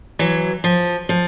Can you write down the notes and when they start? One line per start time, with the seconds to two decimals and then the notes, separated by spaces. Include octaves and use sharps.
0.19 E3 F#3
0.64 F3
1.09 F3